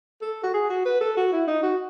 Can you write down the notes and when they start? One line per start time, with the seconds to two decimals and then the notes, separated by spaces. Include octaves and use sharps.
0.22 A4
0.43 F#4
0.54 G#4
0.70 F#4
0.85 B4
1.01 A4
1.17 F#4
1.32 E4
1.47 D#4
1.63 F#4